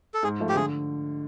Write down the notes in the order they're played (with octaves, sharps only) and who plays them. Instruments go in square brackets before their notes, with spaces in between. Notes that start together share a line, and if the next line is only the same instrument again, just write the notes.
[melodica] A4
[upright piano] G#2 [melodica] G#4
[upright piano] F3 A3
[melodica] G4
[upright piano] D3 [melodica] G#4